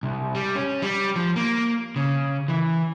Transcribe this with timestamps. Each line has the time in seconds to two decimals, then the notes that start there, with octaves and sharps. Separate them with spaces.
0.03 C2
0.35 G3
0.55 C#4
0.82 G3
1.16 F3
1.36 A#3
1.96 C#3
2.48 E3